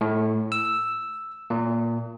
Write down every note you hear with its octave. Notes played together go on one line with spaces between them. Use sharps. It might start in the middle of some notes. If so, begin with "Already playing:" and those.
A2
E6
A#2